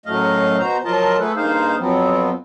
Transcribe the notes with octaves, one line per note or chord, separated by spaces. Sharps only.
F#2 A2 F#3 A3 D#5 F5
B2 F#4 C5 A#5
F3 F#3 F4 A#4 D#5 A5
A3 B3 G#4 A4 B4
G2 A#3 D#4 G#4 C5 F5
F2 F3 F#3 B3 C4